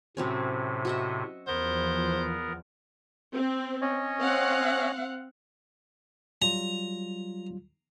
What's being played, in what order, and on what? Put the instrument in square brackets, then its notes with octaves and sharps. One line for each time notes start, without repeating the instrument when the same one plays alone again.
[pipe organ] A2 C3 [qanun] F#3 C4 C#4
[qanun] F#4 D#5 E5
[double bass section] E2 F3 [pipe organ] B3 A#4 [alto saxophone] C5
[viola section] C4
[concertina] C#4 C#5 D#5
[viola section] C4 F5 F#5
[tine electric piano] F#3 G3 F4 [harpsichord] A#5